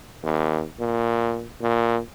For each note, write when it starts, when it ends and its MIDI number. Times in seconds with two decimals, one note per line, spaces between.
0.23 0.63 39
0.79 1.45 46
1.61 1.99 46